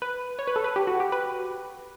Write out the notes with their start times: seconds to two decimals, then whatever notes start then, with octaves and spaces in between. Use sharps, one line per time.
0.02 B4
0.39 C#5
0.47 B4
0.56 A4
0.64 B4
0.76 G4
0.87 F#4
1.00 G4
1.12 B4